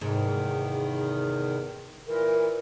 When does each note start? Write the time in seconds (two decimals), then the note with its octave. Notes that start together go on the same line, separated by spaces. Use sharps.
0.01 E2 G#2 C3 D#3
2.07 A#2 E3 A#4